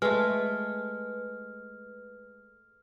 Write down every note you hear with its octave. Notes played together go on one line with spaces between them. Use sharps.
G#3 A3 B4 F6